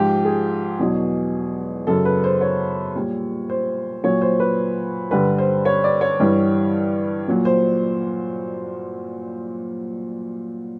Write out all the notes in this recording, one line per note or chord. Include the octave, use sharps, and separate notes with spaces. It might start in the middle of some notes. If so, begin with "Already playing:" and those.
Already playing: G#2 F3 F4 G4
G#4
E2 B2 F#3
F#2 C#3 F#3 A4
B4
C5
C#5
A#2 G3
C5
A#2 F#3 C#5
C5
B4
G2 D3 G3 B4
C5
C#5
D5
C#5
G2 E3 G3
A#2 F#3
C5